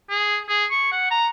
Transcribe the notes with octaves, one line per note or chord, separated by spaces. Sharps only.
G#4
G#4
C#6
F#5
A#5